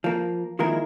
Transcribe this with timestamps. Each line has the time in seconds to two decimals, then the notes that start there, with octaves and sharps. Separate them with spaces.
0.04 F3 A#3
0.59 D#3 F3 G#3 A#3 E4 A#4